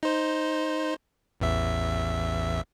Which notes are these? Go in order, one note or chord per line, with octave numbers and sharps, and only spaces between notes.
D#4 C5
A1 E2 E5